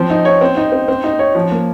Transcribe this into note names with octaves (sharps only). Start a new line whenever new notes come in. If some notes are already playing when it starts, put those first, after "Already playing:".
Already playing: F3 C4
D#4
C#5
C4
D#4
C4
C4
D#4
C#5
F3
A#3